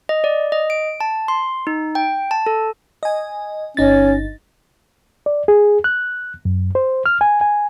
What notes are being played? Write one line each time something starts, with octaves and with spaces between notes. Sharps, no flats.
D#5
D5
D#5
D7
A5
C6
D#4
G5
A5
A4
D#5 G#5
G1 C#4 D#4 A6
D5
G#4
F#6
F#2
C5
F6
G#5
G#5